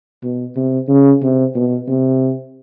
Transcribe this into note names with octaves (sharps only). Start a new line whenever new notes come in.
B2
C3
C#3
C3
B2
C3